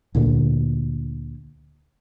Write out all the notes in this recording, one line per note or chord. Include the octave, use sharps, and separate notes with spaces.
D2 A#2 D3